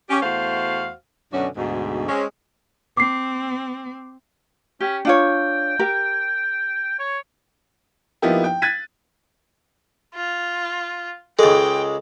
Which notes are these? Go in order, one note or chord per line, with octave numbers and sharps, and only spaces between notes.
C#4 G4
E2 A3 F#4 C5 F5
F#2 B2 D3 C#4 D4 F#4
D2 G#2 B2
G#3 C4 C#4
C4 D6 C7
C#4 G4
D4 F4 C#5 G5
G4 A#4
C#5
F3 A#3 B3 D#4 E4 G4
G5
F#6 G#6 A6 B6 D#7
F4
C#2 G#3 G#4 A4 G5